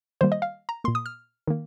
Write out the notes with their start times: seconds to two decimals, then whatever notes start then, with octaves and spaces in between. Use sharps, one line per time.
0.21 D#3 G3 A#3 C5
0.32 D#5
0.42 F5
0.69 A#5
0.84 A#2 A#3 C6
0.95 D#6
1.06 F6
1.47 D#3 A#3